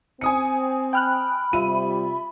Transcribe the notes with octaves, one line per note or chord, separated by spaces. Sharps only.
C4 G#5 D#6 C#7
G5 B5 F6 F#6
C3 G3 F4 E5 D#7